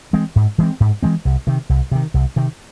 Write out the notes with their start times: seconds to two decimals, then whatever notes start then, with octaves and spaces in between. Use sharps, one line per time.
0.13 E3 G#3 C4
0.36 G#2
0.58 E3 G#3 C4
0.80 G#2
1.03 E3 G#3 C4
1.25 C2
1.47 C3 D#3
1.69 C2
1.91 C3 D#3
2.14 C2
2.36 C3 D#3